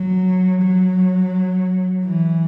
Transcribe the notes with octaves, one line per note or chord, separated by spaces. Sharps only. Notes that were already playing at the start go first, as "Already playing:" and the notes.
Already playing: F#3
F#3
E3